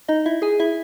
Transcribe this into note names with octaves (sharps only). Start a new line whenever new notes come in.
D#4 D#5
E4 E5
G#4 G#5
E4 E5